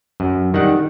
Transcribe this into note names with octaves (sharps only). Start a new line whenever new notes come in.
F#2
D#3 G3 F#5